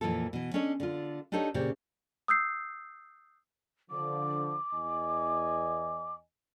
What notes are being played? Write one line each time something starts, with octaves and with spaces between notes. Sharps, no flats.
F2 A#2 E3 A#3 F4 A4
B2 E3
C#4 D4 A4 C#5 D#5
D3 F4
D4 D#4 G4 A4 C#5 D#5
A#2 C#3 C4 G4
D#6 E6 G6 C7
D3 F3 D6
E2 D#5 G#5